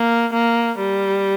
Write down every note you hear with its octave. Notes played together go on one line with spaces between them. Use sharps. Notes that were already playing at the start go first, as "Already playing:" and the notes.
Already playing: A#3
A#3
G3